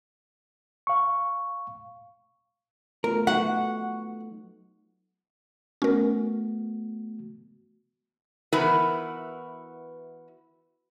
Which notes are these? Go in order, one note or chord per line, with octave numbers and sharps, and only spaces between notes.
F5 C#6
A3 B3 F4 A#4
F#3 D#4 F#4 B4 F#5
A3 B3 C#4 F#4 A#4
E3 B3 E4 F#4 A#4 B4